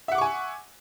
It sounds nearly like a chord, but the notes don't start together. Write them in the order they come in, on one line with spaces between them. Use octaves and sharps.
E5 F#5 D6 C#6 G#5